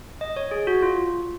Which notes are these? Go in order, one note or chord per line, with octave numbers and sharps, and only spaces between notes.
D#5
C#5
G#4
F#4
F4